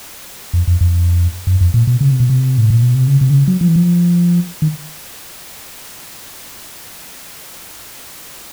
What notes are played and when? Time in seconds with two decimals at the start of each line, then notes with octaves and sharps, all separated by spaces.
0.53 F2
0.67 F2
0.81 F2
1.47 F#2
1.61 F2
1.74 A#2
1.87 B2
2.01 C#3
2.11 C3
2.20 B2
2.30 C3
2.58 A2
2.70 A#2
2.82 B2
2.95 C3
3.08 C#3
3.21 C3
3.30 D3
3.34 C#3
3.48 F#3
3.61 F3
3.68 E3
3.76 F3
4.62 D#3